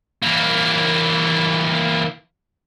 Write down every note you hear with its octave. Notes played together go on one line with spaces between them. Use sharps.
E3 A#3